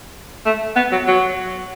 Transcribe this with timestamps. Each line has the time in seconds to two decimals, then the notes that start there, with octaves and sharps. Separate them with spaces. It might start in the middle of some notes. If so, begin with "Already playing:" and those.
0.46 A3
0.76 B3
0.92 F#3
1.07 F#3